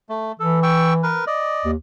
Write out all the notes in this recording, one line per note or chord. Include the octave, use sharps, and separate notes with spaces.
A3
E3 A4
G5 C#6 E6
A#4 B4
D5 D#5
D#2